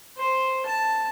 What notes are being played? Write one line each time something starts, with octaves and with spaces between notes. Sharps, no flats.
C5
A5